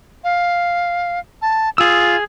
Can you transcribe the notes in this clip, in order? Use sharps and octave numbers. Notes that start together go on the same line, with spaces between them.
F5
A5
F4 G#4 E6